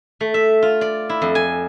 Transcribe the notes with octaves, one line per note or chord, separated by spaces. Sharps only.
A3
E5
F4
D5
E4
F2
G#5